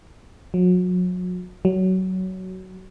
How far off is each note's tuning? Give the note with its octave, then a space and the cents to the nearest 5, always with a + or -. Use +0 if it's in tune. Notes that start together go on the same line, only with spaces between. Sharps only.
F#3 -35
F#3 +15